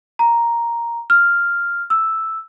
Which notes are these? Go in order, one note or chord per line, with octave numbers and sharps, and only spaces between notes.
A#5
F6
E6